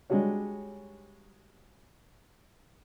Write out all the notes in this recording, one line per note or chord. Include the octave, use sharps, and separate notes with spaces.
G3 G#3 D4 F#4 C#5